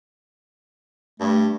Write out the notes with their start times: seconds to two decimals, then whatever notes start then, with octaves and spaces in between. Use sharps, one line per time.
1.20 G2 A3